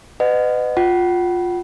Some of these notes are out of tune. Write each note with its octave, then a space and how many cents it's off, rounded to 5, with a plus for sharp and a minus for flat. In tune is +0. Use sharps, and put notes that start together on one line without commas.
B4 +35 D#5 -25 F#5 +0
F4 +15 F#5 +40